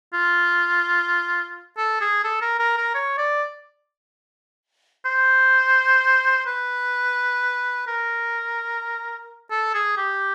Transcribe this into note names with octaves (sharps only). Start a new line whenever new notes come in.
F4
A4
G#4
A4
A#4
A#4
A#4
C#5
D5
C5
B4
A#4
A4
G#4
G4